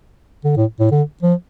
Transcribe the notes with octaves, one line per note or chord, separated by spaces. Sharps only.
D3
A2
A2
D3
F3